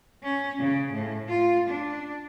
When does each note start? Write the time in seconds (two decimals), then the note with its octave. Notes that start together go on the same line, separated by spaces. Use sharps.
0.23 C#4
0.59 C#3
0.93 A2
1.28 F4
1.69 D4